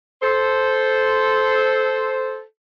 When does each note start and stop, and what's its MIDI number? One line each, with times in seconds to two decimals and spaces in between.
0.23 2.40 69
0.23 2.40 72